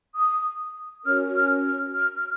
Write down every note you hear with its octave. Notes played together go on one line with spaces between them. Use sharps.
D#6
C#4 F#4 A#4 C#5 F6
F6
F6
F6
F6